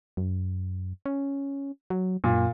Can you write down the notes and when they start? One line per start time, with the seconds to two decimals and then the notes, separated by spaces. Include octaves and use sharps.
0.17 F#2
1.06 C#4
1.90 F#3
2.24 F#2 A#2